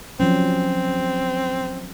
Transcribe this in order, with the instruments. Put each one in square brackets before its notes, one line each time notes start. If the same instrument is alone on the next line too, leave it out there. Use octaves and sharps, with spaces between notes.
[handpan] F3 F#3 C#4 [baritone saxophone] C4